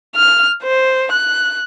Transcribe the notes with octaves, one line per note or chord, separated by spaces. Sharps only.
F6
C5
F#6